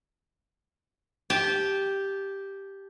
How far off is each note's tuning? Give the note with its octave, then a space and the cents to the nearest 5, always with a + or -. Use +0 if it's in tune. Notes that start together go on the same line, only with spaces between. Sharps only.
G4 +0 A5 -25